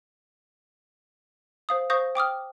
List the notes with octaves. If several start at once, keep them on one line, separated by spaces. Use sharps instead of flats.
C5 F5 D#6
C5 F5 C#6 D#6 G6 A#6
G5 D6 D#6 F6